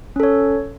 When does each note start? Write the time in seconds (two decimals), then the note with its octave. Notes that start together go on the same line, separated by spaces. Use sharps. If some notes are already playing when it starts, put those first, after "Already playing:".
0.16 C#4
0.20 A4
0.23 C#5